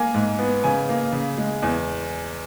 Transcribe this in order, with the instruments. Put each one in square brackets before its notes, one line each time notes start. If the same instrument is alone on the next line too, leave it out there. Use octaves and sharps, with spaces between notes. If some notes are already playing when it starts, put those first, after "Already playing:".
Already playing: [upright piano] A#3 G#5
G#2
B3
C#3 G#5
A#3
C#3
G#3
E2 G#5